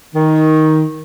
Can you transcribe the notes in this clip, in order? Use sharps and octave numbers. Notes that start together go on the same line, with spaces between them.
D#3